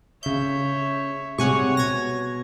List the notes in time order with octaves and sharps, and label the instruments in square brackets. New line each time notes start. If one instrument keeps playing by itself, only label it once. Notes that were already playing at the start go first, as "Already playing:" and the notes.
[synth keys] C#3 G6 [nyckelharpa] C#5 E5
[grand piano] C3 G3 G#3 [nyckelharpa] C#5 [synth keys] F#5 G#5 C#6
[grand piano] B2 [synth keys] G#6 A#6